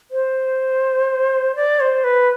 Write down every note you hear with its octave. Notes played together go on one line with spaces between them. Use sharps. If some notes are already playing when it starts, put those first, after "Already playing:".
C5
D5
C5
B4